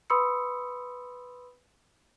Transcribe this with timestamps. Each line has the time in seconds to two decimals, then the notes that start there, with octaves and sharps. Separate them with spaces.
0.10 B4 B5 C6 D#6 E6 C#7